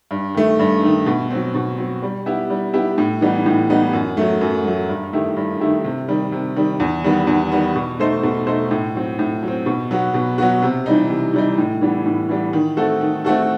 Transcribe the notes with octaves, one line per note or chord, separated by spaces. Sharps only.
G2
D#3 A3
G2
D#3 A3
B2
F#3 C4
B2
F#3 C4
G3
B3 E4 G4
G3
B3 E4 G4
A2
E3 G3 B3 D#4
A2
E3 G3 B3 D#4
F#2
F#3 A3
F#2
F#3 A3
G2
D#3 A3 E4 G4
G2
D#3 A3 E4 G4
C3
D#3 G3
C3
D#3 G3
E2
D#3 G3 B3
E2
D#3 G3 B3
B2
A3 D#4 A4 C5
B2
A3 D#4 A4 C5
A2
F#3 C4
A2
F#3 C4
B2
F#3 B3 F#4
B2
F#3 B3 F#4
C3
E3 G3 D#4
C3
E3 G3 D#4
A2
E3 G3 B3
A2
E3 G3 B3
D#3
A3 C4 F#4 A4
D#3
A3 C4 F#4 A4